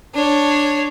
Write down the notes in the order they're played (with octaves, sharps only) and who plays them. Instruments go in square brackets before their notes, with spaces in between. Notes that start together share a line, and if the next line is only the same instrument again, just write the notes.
[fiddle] D4 C#5